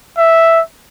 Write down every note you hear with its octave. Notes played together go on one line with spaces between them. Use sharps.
E5